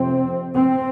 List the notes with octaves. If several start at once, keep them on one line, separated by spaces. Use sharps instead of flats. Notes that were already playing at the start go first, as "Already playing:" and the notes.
Already playing: F2 C3 C4
C4